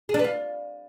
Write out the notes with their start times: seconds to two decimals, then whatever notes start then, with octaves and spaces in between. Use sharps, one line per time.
0.09 G#4
0.14 D4
0.19 B4
0.24 F4